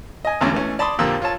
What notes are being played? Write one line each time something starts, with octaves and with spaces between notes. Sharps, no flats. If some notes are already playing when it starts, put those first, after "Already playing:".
D#5 G#5
G#1 E2 D3 G#3 A3 C#4
E3 A3 C#4
D5 A5 B5 C6 D#6
F2 A#2 D3 G4 A#4 E6
F4 C#5 A5